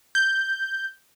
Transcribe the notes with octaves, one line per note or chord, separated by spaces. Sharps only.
G6